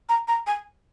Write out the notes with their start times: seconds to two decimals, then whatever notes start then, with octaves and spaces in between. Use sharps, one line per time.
0.09 A#5
0.28 A#5
0.47 G#5